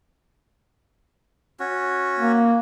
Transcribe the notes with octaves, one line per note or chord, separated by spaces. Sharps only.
C#4 F#4
A#3